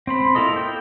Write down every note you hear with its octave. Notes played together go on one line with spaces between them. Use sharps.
C4 C5 B5
A#3 E4 F4 A4 D#5
G5